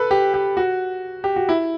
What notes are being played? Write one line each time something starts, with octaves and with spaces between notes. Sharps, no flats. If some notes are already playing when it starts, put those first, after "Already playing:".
Already playing: A4 B4
G4
G4
F#4
G4
F#4
E4